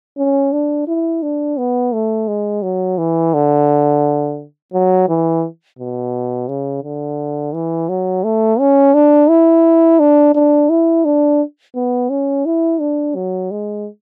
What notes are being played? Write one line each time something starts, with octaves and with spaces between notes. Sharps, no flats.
C#4
D4
E4
D4
B3
A3
G#3
F#3
E3
D3
F#3
E3
B2
C#3
D3
E3
F#3
A3
C#4
D4
E4
D4
D4
E4
D4
B3
C#4
E4
D4
F#3
G#3